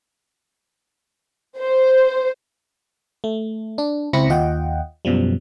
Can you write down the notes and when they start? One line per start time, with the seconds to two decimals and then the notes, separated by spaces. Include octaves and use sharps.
1.58 C5
3.24 A3
3.78 D4
4.13 C#2 C4 E4 B5 A#6 C#7
4.29 D#2 F4 D#5 F#5 G5
5.05 F#2 B2 F3 G3